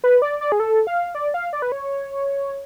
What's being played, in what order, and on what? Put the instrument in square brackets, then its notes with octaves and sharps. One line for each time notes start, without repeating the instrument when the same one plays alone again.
[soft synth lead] B4
D5
D5
G#4
A4
F5
D5
F5
D5
B4
C#5